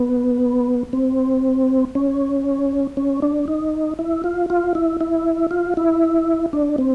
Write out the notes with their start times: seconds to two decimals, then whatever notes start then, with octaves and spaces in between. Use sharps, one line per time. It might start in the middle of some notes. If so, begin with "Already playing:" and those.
Already playing: B3
0.93 C4
1.95 C#4
2.97 C#4
3.22 D4
3.48 D#4
3.99 E4
4.24 F4
4.50 F4
4.75 E4
5.01 E4
5.51 F4
5.77 E4
6.53 D4
6.78 C4